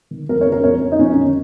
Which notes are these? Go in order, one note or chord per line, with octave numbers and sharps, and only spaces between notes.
D#3
F2 A#4
C#5
C#3
A#4
F2 C#5
C#3
D#4
F2 C#4
D#3